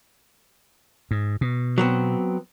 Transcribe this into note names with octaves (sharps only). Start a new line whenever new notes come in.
G#2
B2
F#3 B3 C4